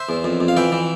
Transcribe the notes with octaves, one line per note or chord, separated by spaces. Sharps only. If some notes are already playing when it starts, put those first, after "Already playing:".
Already playing: C5 E5
E2
F2
F2
F5
E3 E5 G5
E3